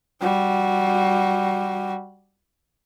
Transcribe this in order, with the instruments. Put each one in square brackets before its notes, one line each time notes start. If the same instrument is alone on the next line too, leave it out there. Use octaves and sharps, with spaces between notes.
[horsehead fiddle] G3 F#4